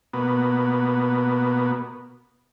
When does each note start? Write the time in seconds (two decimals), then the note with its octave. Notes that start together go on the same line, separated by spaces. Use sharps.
0.13 B2 A#3 B3 F#4